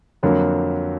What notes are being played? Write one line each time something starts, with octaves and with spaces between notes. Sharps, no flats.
F2 D3 F#3 A#3